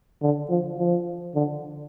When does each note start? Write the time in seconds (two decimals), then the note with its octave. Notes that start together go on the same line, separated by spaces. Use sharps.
0.22 D3
0.50 F3
0.78 F3
1.35 D3